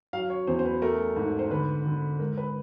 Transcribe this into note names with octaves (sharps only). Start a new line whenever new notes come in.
F#3 F5
C#5
E2 C5
C5
B4
A3 A#4
G#2
C5
D3 B4
D3
G#3 A#4
B4